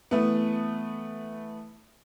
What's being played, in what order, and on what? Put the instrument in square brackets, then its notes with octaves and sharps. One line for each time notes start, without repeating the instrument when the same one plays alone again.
[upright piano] E3 A3 B3